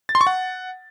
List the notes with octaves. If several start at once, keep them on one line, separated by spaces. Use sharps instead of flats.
A6
C6
C#6
F#5